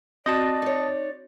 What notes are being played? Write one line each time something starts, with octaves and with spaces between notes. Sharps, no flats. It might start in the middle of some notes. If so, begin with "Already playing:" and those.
C4 F#4 D5 D#5 A5 A#6
D#4 C#5